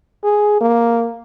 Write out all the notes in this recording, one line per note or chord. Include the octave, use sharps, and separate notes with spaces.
G#4
A#3